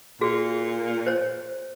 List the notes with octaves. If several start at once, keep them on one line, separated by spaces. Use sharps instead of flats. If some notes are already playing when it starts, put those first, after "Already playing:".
A#2 F#4 G#4
C5 C#5